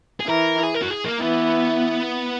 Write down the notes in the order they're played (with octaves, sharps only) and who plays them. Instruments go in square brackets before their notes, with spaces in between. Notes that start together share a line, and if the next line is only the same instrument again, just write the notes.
[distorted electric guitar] G#4
[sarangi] E3 [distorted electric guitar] A#4
[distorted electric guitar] G#4
A#4
F#4
G#4
A#3
[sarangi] E3 [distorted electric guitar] B3